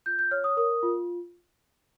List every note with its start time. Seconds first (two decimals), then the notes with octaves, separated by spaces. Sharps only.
0.06 F4 G6
0.19 G6
0.31 C#5 F6
0.44 D#6
0.57 A#4 D#6
0.83 F4